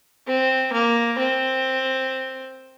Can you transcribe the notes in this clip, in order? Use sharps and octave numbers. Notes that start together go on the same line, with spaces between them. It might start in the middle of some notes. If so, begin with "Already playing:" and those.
C4
A#3
C4